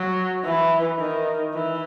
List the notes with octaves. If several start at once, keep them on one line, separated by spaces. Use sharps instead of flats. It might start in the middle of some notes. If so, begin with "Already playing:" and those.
Already playing: F#3
E3
D#3
E3